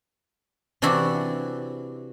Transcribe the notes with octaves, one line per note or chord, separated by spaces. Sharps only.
C3 E3 D4 E4 F#4 E5